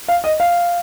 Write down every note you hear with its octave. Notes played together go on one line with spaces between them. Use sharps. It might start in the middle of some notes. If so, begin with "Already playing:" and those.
F5
D#5
F5